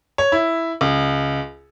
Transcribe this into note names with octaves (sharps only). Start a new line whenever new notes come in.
C#5
E4
C#2